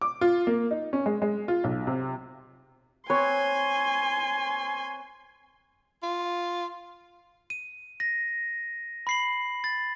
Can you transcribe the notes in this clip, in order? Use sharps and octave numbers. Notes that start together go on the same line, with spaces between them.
D6
F4
A#3
D#4
C#4
G#3
G#3
F4
B1
C3
C4 B4 C#5 G#5 C6
F4
D#7
A#6
B5 C7 F#7
A6